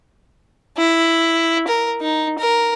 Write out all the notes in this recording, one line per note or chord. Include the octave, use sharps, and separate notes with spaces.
E4
A#4
D#4
A#4